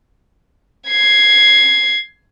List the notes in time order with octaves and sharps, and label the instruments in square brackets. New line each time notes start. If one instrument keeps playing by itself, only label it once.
[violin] G#6 C7